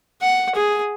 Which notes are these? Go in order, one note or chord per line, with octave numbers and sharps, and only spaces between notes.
F#5
G#4